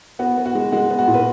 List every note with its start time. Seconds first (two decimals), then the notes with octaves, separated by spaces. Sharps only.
0.19 B3 F#4
0.37 B3
0.46 F#4
0.55 G#3
0.72 G#3 F#4
0.90 B3
0.99 F#4
1.08 A#2
1.14 B4